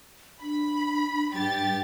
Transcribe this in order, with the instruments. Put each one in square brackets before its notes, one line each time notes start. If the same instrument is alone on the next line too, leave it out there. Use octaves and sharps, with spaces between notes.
[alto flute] D4 [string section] B5
[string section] G2 G4 A6